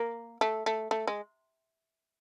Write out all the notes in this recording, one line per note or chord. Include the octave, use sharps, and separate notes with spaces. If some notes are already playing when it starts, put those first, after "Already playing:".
Already playing: A#3
A3
A3
A3
G#3